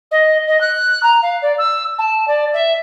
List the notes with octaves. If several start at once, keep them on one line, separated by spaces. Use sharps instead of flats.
D#5
D#5
F#6
A#5
F5
D5
E6
A5
D5
E5